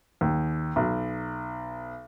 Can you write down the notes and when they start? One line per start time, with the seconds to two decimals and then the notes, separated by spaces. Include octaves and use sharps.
0.21 D#2
0.76 B1